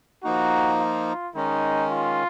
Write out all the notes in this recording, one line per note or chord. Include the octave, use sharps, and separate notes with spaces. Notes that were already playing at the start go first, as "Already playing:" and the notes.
F3 A#3 D#4 F#4
F4
D#3 G#3 C#4 D#4
F4